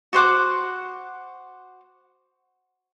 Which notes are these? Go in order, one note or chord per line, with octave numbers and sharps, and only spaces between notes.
F#4 C5 F#5 D6